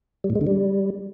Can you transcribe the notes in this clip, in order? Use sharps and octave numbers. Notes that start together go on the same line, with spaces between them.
G3
A2
G#3
D3
G3